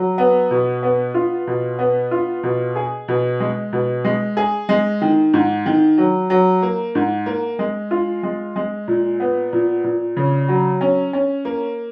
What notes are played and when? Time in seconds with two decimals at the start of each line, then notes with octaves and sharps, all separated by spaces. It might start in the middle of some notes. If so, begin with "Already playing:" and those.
Already playing: F#3
0.18 B3
0.51 B2
0.83 B3
1.14 F4
1.47 B2
1.79 B3
2.11 F4
2.43 B2
2.76 G#4
3.08 B2
3.40 G#3
3.73 B2
4.05 G#3
4.37 G#4
4.69 G#3
5.02 D#3
5.34 G#2
5.66 D#3
5.98 F#3
6.30 F#3
6.62 A#3
6.95 G#2
7.26 A#3
7.59 G#3
7.91 F4
8.23 G#3
8.56 G#3
8.88 A#2
9.20 B3
9.53 A#2
9.84 A#2
10.17 C#3
10.48 F#3
10.81 C#4
11.13 C#4
11.45 A#3